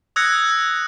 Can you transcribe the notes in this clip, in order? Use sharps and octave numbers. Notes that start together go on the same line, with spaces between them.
D#6 E6 F#6 G#6 A#6 C#7